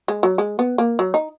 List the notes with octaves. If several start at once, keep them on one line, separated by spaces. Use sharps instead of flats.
G#3
F#3
G#3
B3
A#3
F#3
D#4